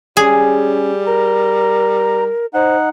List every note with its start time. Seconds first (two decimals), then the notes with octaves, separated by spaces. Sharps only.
0.17 G3 C#4 G#4
1.07 A#4 A#5
2.54 D#4 C5 F#5